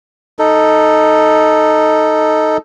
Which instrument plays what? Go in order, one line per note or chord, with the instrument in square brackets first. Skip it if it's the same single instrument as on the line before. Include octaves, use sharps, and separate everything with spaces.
[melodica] D#4 A4